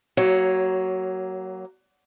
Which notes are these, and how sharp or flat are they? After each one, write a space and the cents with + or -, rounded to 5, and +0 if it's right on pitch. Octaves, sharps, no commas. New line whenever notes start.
F#3 +20 A#3 -10 C#5 +0